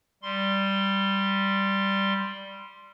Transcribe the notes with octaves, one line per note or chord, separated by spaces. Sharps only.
G3 C6